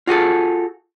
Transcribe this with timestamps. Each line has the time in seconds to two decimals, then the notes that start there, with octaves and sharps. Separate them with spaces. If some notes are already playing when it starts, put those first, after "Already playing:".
0.07 F4 F#4 G#4 A4